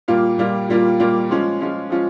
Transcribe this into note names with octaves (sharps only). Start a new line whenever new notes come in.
A#2 G3 A#3 F4
A#2 G3 A#3 F4
A#2 G3 A#3 F4
A#2 G3 A#3 F4
F3 G#3 C#4 F4
F3 G#3 C#4 F4
F3 G#3 C#4 F4